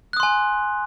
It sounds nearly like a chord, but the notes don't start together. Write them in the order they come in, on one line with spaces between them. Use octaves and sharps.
F#6 D#6 C6 G#5